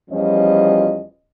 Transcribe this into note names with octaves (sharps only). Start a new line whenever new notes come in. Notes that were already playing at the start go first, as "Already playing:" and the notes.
E2 F3 G3 C#4 F4 D#5